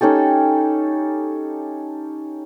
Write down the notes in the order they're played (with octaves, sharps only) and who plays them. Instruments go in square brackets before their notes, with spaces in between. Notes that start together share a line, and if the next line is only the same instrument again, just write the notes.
[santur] C#4 D#4 G4 A4